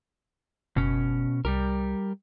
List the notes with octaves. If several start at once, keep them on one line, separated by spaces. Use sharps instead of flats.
F#1 B2 C#4
C2 G3 G4 A#4